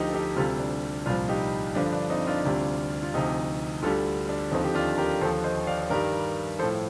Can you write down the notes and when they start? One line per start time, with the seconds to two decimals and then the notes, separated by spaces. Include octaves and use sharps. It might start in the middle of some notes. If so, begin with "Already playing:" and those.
Already playing: D2 D3 F3 D#4 G4
0.09 A4
0.14 D#4 G4
0.36 D2 C3 G3 F4 A4
0.59 D4
1.06 C2 A#2 F3 D4 F4
1.29 D#4 G4
1.75 G2 D3 F3 D4
1.93 D4
2.10 C4 D#4
2.27 D4 F4
2.45 D2 C3 G3
3.03 F4
3.14 D2 C3 F3 D#4 G4
3.83 D2 D3 G3 F4 A4
4.29 D4
4.51 D#2 D3 F3 C4 D#4
4.64 G4
4.75 D4 F4
4.98 G4 A#4
5.21 D#2 D3 F3 A4 C5
5.44 C5 D#5
5.67 D5 F5
5.90 G2 D#3 G3 A#4 D5
6.59 F3 A4 C5
6.63 A2